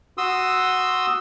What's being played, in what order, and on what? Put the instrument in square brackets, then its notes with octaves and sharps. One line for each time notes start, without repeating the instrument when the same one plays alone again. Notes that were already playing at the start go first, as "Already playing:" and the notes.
[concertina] F#4 C6 D#6 E6